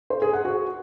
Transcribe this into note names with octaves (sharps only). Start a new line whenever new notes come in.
C5
G#4
F#5
F#4